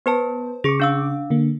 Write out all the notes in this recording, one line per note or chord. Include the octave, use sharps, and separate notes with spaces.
B3 B4 C5 A5
C#3 G#4 C#6 D6 C#7
D4 F5 E6
D3 A#3